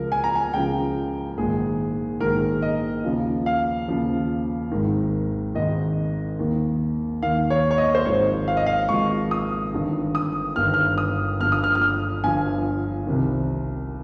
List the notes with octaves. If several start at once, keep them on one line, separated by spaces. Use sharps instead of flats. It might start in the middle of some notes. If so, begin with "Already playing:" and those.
Already playing: C#2 C#3 F3 A#4
G#5
A#5
G#5
C#2 C#3 F3 G5
A#1 G#2 D#3 G#4
A#1 G#2 D#3 A#4
D#5
D#2 C#3 F3
F5
D#2 C#3 F3
G#1 G#2 D#3
G#1 G#2 D#3 D#5
D#2 D#3
D#2 D#3 F5
C#5
C#5
D#5
C5
G#1 G#2 F3 C#5
F5
D#5
F5
G#1 G#2 F3 C#6
D#6
G1 G2 D#3
D#6
G1 G2 D#3 F6
F6
D#6
G1 G2 F3 F6
D#6
F6
F6
D#6
G1 G2 F3 G#5
C2 C3 D#3